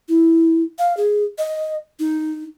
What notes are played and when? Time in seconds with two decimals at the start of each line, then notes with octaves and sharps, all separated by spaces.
0.09 E4
0.79 F5
0.97 G#4
1.38 D#5
1.99 D#4